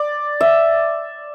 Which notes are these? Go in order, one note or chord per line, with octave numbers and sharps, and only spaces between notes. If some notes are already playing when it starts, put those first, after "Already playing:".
Already playing: D5
E5